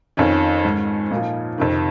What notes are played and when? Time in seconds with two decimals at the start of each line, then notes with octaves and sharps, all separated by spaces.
0.17 F2 D#3 C#4
0.65 G#2 D#3
1.11 A#2 F3 D#4
1.58 F2 C3 D#3